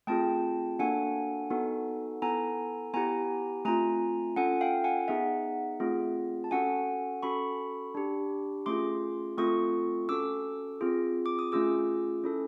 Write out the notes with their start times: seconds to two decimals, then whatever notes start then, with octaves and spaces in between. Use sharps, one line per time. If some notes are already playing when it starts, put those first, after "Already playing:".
0.07 A3 C4 F4 G#4 G5 A5
0.79 A#3 D4 F#4 A4 F#5 G#5
1.50 B3 D#4 F#4 A4
2.22 B3 E4 A4 G#5 A#5
2.94 B3 E4 G4 G#5 A#5
3.65 A3 C4 F4 G#5 A#5
4.36 C#4 F4 A4 F#5 G#5
4.61 F5 G5
4.84 F#5 G#5
5.08 B3 D#4 G#4 E5 F#5
5.80 A3 C4 F4 G#4
6.44 A5
6.51 C#4 F#4 A4 F#5 G#5
7.23 C#4 F#4 A4 B5 C#6
7.95 D4 G4
8.66 A3 C#4 F4 G#4 C6 D6
9.37 A3 C4 F4 A4 C#6 D#6
10.09 C#4 F#4 A4 D6 E6
10.81 C4 F4 G#4
11.26 D6
11.39 D#6
11.52 A3 C#4 F4 G#4 D6 E6
12.24 C#4 E4 A4